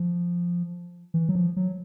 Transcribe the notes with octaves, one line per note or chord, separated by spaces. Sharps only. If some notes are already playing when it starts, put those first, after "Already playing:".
Already playing: F3
E3
F#3
F3
F#3